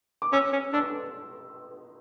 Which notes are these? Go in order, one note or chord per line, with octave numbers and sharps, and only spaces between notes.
D6
C#4 E6
C#4
D4 E6